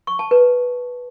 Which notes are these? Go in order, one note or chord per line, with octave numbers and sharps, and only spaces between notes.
C#6
A5
B4